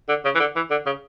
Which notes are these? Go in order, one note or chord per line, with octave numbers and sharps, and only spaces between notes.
D3
C#3
E3
D3
E3
D3
C#3